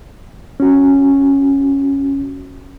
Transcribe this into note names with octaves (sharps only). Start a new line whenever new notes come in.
C#4 F#4